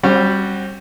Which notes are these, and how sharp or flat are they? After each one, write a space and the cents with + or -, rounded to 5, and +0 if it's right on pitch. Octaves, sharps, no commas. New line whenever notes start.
G3 +0 C4 +40 F#4 +0